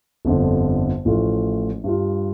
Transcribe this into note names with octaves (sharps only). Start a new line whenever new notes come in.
G1 F2 D3
A1 A2 F3 A3 F4
G2 G3 F4